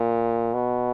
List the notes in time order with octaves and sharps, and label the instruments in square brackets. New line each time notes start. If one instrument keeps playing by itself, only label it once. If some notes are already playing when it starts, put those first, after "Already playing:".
Already playing: [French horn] A#2
B2